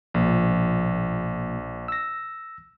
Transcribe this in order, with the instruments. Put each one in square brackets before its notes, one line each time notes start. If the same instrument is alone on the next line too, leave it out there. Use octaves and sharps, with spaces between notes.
[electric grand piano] A#1 [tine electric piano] B2 F3 A#3
[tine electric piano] E6 A#6